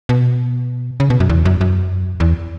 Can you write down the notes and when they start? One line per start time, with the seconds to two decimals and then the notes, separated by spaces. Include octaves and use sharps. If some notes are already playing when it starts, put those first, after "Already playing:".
0.09 B2
1.00 C#3
1.10 B2
1.20 F#2
1.30 E2
1.45 F#2
1.61 F#2
2.20 E2